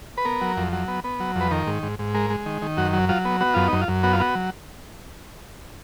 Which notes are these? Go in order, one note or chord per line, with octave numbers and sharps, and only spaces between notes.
B4
B3 A#4
F#3
F2
F#3
B3
B3
F#3
F2
B4
D#3 A#4
G#2
G#2
G#2
G#3 A#4
G#3
D#3
D#3
F#2 F#4
F#3
F#3 F4
B3
B3 F#4
F#2 F4
F#2 D#4
F4
F#2
B3 F#4
F4
B3 F#4
F#3